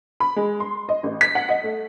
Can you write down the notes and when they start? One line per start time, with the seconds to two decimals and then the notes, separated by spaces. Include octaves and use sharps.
0.20 B5
0.36 G#3
0.60 C6
0.89 D#5
1.03 A1
1.21 B6
1.35 F#5
1.49 D#5
1.64 A3